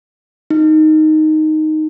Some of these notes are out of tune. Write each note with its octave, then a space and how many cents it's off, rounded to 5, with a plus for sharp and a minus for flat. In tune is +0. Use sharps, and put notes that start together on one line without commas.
D#4 +0